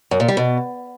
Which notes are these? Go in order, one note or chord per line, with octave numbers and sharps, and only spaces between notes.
F#2
A#2
G3
B2